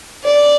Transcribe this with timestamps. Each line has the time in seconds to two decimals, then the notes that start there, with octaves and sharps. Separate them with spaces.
0.25 D5